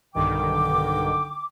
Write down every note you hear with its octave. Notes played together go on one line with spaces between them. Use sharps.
B1 G2 D3 D#3 G5 D6